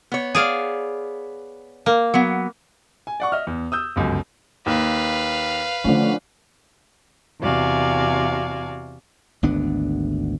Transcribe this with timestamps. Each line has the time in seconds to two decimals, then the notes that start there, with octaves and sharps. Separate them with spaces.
0.12 B3 C#5
0.35 G#4 D5 F5
1.86 A#3
2.14 F#3 B3
3.07 G#5
3.20 D5 F#5 C#6
3.32 D#5 E5 F6
3.47 E2
3.72 D#6 E6 G6
3.96 G1 C#2 F#2
4.66 D#2 B4 F5
5.84 D3 F3 A3 C#4
7.40 E2 C3 F#4 D5 F5 G#5
9.43 G#1 D2 B3 D4